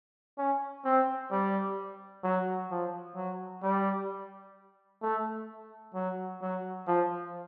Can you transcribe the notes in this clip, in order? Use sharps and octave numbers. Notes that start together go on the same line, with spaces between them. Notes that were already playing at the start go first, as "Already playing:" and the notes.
C#4
C4
G3
F#3
F3
F#3
G3
A3
F#3
F#3
F3